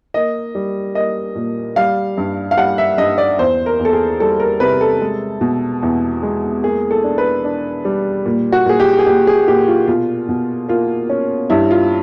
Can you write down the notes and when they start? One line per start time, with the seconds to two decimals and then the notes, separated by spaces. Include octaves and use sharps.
0.14 A#3 D#5
0.55 G3
0.95 A#3 D#5
1.35 A#2
1.76 G3 F5
2.17 G2
2.51 F5
2.57 G3 F#5
2.78 E5
2.98 G2 D#5
3.18 D5
3.38 E2 C5
3.66 A#4
3.79 E2
3.85 A4
3.93 G#4
4.20 G3 A4
4.40 A#4
4.60 C3 B4
4.81 A4
5.01 G#3
5.41 B2
5.83 E2
6.23 G#3
6.63 A#3 G#4
6.91 A4
7.04 D4
7.18 B4
7.44 D4
7.85 G3
8.26 A#2
8.52 F#4
8.66 A#2 G#4
8.80 G4
8.99 G#4
9.07 A#2 G4
9.27 G#4
9.47 A#2 G4
9.68 F4
9.87 B2 F4
10.29 B2
10.68 A#3 F4
11.09 C#4
11.50 G2 E4
11.71 F4